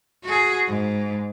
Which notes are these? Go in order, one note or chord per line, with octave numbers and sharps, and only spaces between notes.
F#4 G#4
G#2